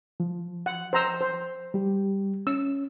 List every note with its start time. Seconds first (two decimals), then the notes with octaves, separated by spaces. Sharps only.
0.20 F3
0.66 F#5
0.93 C5 A#5 E6
1.21 C5
1.74 G3 G4
2.47 C#4 E6